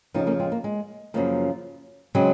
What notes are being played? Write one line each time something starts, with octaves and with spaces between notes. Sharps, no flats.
F2 C#3 F3 C4 D#4
A#3 C#4
G#3 C4
A#3
G#3
F#2 C#3 F3 A#3
C#3 F#3 G#3 C4